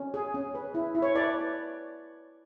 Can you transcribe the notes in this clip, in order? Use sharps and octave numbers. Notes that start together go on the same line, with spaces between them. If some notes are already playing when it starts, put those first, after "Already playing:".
Already playing: C#4
G#4
C#4
B4
E4
E4
C#5
B4 D5